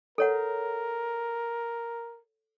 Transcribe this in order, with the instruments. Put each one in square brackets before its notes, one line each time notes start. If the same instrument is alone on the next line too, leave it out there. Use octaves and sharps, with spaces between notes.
[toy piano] A4 C#5 F#5 [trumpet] A#4